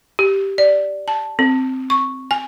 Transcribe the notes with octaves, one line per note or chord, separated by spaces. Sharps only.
G4
D5
A5
C4
C#6
G#5